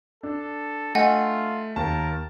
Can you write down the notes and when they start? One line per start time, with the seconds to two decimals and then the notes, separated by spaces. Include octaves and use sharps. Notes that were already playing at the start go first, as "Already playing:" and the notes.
0.23 D4 A4
0.95 A3 F4 D#5 F#5 G#5
1.76 D#2 A#4 A5